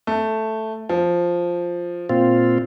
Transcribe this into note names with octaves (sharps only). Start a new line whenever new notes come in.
A3
F3
A#2 C4 F4